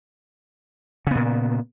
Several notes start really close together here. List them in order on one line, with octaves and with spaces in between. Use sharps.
C#3 B3 A#2